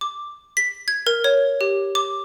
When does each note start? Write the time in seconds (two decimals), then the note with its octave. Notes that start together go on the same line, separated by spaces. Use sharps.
0.01 D6
0.57 B6
0.88 G#6
1.07 A#4
1.24 C#5
1.61 G4
1.95 D6